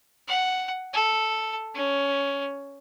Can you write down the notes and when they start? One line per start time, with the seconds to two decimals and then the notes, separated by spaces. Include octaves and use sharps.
0.28 F#5
0.93 A4
1.74 C#4